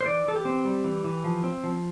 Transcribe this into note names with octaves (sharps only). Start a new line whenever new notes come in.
C5
E3 D5
E3 A4
G4
C4
G3
E3
E3
F3
C4
F3